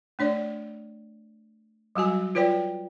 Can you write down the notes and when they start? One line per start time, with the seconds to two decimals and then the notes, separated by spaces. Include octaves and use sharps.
0.19 A3 D4 C#5 D5
1.95 F#3 G3 F#4 G#5
2.35 F4 B4 C#5 D5 G5